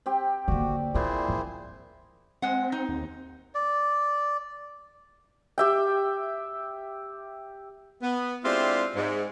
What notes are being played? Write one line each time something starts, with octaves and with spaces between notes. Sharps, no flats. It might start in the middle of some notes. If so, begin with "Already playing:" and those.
C4 G4 G5
D3 A#3 F#4 D5
A#2 C4 E4 G#4 C5 D6
F3
G#3 C4 F#5
D#4
D#2
D5
G4 E5 G5
B3
G#3 C4 D4 E4 F4 G4
G#2